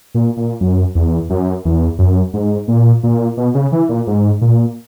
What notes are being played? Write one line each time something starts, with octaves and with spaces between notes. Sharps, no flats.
A#2
A#2
F#2
E2
F#2
E2
F#2
G#2
A#2
A#2
B2
C#3
E3
A#2
G#2
A#2